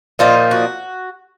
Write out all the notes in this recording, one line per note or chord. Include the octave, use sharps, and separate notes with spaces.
A#2 F3 A#3 D#4 F4
F#4